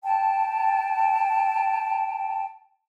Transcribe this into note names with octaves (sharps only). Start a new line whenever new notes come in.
G5 A5